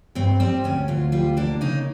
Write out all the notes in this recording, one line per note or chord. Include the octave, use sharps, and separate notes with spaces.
G2 C4
G3 C4
D2 C#4
D2 F4
G3 F4
A#3 D4
C#3 D#4